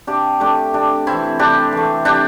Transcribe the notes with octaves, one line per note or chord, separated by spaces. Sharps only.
C3 D4 G4
A3 D4 G4
C3 D4
E3 A3 C4 E4
C3 D4 G4
E3 A3
C3 D4 G4